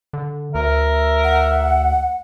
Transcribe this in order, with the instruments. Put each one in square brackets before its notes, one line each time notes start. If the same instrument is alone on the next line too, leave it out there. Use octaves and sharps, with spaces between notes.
[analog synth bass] D3
[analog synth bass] D2 [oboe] A#4 [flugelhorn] E5
[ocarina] F#5